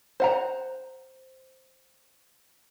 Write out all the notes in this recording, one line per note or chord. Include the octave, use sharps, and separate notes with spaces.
C5 F#5 A#5